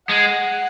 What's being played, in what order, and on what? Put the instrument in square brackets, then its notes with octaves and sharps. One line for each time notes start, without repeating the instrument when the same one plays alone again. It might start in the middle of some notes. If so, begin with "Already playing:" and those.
[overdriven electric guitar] G#3 [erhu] F#5